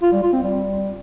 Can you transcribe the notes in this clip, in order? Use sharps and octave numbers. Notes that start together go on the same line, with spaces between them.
F4
G3
F4
C4
G3